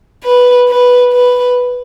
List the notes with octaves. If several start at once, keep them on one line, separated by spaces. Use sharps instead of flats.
B4
B4
B4